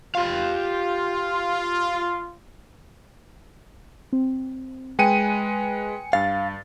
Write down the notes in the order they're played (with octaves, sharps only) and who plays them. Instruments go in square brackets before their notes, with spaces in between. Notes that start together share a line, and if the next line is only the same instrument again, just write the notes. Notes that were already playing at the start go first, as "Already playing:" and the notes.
[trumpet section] F4 [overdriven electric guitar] G4 F5
[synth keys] C4
[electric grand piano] G#3 B4 D#7 [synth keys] G5 G#5 C#7
[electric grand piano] G2 A6 [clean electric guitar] F5